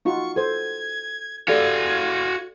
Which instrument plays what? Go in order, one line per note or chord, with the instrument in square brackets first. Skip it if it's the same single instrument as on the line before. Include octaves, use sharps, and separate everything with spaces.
[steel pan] D#4 F4 F#4 [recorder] C#6
[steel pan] A4 C5 [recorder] G#6
[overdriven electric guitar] F#4 F5 [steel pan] G4 A4 D5 [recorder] G#6